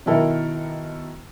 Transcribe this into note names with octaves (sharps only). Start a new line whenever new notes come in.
B2 D#3 E4 A4 A#4